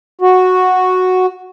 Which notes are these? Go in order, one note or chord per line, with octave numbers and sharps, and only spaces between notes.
F#4